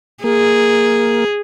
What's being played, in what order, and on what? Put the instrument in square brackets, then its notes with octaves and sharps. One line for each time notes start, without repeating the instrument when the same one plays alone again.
[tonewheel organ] A#3 [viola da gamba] G#4